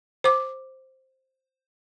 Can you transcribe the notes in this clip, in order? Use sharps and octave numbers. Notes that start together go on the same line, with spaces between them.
C5 D6